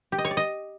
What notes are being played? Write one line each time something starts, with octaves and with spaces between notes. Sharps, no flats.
G4
D#5
C#5
D5
D#5